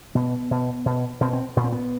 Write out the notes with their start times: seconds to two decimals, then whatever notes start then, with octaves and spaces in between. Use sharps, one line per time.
0.15 B2 B3
0.51 B2
0.86 B2
1.21 B2 C4
1.33 C4
1.56 A#2 B3
1.64 C4
1.72 B3